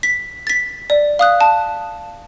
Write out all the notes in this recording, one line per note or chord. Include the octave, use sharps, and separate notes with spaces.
B6
A6 B6
D5
F5 D#6 F#6
A5